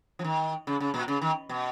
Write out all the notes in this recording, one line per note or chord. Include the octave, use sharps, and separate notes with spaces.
F3
D#3
C#3
C#3
A#2
C#3
D#3
B2